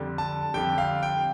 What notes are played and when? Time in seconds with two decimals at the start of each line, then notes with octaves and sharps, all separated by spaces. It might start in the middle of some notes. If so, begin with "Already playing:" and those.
Already playing: F2 D3 G3
0.18 A5
0.54 F2 D3 G3 G5
0.78 F5
1.03 G5